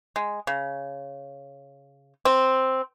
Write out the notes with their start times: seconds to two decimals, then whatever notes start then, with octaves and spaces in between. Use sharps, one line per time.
0.16 G#3
0.47 C#3
2.25 C4